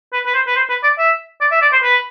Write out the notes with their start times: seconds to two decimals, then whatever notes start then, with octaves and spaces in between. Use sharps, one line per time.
0.13 B4
0.26 B4
0.34 C5
0.47 B4
0.56 C5
0.69 B4
0.83 D5
0.99 E5
1.41 D5
1.52 E5
1.62 D5
1.73 C5
1.83 B4